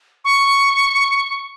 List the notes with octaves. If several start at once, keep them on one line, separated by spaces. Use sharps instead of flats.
C#6